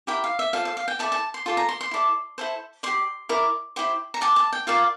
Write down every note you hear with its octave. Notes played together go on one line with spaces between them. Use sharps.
E4 G4 A#4 G5
F5
E5
F4 A4 C5 F5
F5
F5
G5
E4 A4 D5 A5
A5
C6
F4 A4 D5 C6
A#5
C6
C6
E4 A4 D5
E4 A4 C5
G4 D5 C6
E4 A#4 D5
E4 G4 C5
A#5
G4 D5 A5
A5
G5
F4 A#4 D5 F5